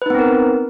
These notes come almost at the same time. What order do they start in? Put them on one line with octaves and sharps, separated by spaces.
B4 D#4 B3 C4 A#4